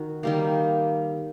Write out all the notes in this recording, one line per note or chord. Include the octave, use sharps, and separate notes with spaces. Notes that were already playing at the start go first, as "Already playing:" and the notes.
Already playing: D#3 F#4
D#3 G3 A#3